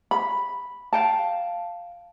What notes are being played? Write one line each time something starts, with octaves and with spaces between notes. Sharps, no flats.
B5
F5 G5 A5